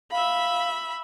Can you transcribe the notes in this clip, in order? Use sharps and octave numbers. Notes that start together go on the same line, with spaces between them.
E5 F5 B5